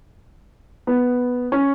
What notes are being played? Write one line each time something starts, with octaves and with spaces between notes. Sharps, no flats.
B3
C#4